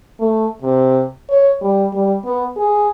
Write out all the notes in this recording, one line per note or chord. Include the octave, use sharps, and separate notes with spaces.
A3
C3
C#5
G3
G3
B3
G#4